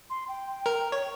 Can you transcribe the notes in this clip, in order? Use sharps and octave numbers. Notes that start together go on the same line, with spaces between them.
C6
G5
A#4
C#5